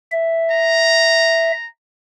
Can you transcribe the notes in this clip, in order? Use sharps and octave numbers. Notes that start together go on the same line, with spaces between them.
E5
A#5